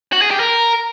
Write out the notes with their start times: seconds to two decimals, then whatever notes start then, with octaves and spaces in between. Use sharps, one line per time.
0.13 F#4
0.22 G#4
0.31 G4
0.40 A#4